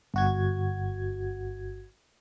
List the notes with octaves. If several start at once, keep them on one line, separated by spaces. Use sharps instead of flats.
G1 F#4 G#6